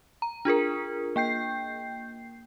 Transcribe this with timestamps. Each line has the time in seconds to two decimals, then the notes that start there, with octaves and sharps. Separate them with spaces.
0.22 A#5
0.45 D4 F4 G#4 A#4
1.16 A#3 G5 G6 C7